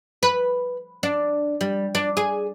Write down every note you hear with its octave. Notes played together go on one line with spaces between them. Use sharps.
B4
D4
G3
D4
G#4